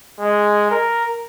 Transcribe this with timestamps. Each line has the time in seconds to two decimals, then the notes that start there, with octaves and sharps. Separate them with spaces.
0.20 G#3
0.71 A#4